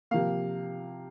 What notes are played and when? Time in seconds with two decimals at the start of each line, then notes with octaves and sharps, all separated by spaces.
0.11 C3 F3 A#3 F5